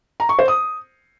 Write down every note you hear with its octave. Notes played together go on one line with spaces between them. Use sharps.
A#5
C#6
C5
D#6